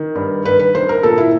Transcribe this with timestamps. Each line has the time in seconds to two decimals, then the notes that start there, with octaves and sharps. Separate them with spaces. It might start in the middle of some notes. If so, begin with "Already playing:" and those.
Already playing: D#3
0.15 G2
0.45 G2 B4
0.59 B4
0.75 D#3 C5
0.89 A#4
1.03 A#2 A4
1.18 E4